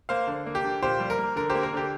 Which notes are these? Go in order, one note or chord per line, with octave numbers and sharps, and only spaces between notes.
A#3 C5 F5
D3
A#3
G4
D3
A#2 G4 C5
G3
A#4
A#3
D3 A#4
G4 C5
A#3
A#4
D3 G4